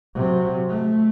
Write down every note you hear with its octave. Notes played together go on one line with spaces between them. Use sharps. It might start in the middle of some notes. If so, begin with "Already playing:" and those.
C3 F#3
A3